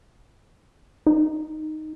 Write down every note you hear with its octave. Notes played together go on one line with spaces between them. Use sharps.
D#4